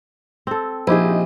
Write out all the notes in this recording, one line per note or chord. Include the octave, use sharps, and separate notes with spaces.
C4 A4
A#1 D#4 E4 G4 G#4 C5